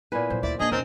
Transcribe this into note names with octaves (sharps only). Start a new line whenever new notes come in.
A#2 B3 E4 B4 G#5
A#2 F#3 C5
D2 E4 D5 E5
A#3 B3 D4 G#4 D#5
E1 C4 C#4 D#4 A#4 C#5